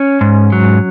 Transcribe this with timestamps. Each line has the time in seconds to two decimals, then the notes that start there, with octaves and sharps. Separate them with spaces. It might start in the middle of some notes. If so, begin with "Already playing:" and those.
Already playing: C#4
0.21 G#2
0.52 F#3